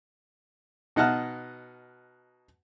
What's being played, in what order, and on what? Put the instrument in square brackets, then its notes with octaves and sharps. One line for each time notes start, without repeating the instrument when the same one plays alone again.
[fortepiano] B2 D#4 F#5 A5 F6 F#6